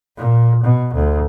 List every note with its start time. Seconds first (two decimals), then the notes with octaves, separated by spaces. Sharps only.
0.17 A#2
0.64 B2
0.95 D2